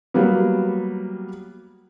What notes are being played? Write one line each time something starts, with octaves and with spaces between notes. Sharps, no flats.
F#3 G3 A#3 B3